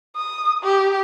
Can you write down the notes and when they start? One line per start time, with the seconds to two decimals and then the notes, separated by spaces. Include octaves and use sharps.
0.16 D#6
0.63 G4